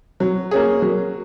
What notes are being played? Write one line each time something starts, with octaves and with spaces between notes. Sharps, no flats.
F#3
A#3 C#4 G#4
F#3